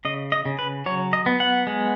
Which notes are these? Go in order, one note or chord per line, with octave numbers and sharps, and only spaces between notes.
C#3 D#5
D#5
C#3
B4
F#3 C#5
D#5
B3
F#5
G#3